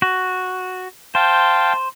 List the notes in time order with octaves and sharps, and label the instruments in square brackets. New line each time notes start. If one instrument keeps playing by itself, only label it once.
[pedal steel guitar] F#4
[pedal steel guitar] C5 [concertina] F5 G5 A5